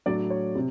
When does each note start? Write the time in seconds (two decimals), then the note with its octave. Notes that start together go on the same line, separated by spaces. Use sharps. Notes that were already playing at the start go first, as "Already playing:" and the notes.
0.06 A2 F#3 A3 D4 D5
0.30 C#5
0.55 C3